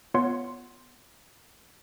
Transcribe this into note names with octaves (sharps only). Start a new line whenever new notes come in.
B3 F4 C#5 F#5 C6